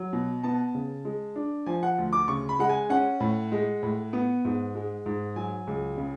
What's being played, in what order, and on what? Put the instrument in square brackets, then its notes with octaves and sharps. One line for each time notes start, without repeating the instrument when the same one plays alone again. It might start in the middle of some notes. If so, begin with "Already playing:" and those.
Already playing: [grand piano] F#3
B2
B3 A5
C#3
G#3
D4
F3 G#5
F#5
D2
D6
C#3 C#6
B5
G#3 F#5
G#5
C#4 F#5
A2
G#3
A2
B3
G#2
G#3
G#2
F#3 G#5
C#2
C#3